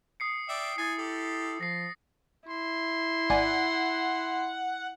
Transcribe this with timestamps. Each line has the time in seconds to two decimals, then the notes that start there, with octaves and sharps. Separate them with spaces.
0.20 D#6 C7 C#7
0.49 D5 E5 G5
0.78 E4 G#5 D#6 A6 C7
0.98 G4 A4
1.61 F3 A#6 C7
2.49 E4 C6
3.30 G#1 D5 F#5 G#5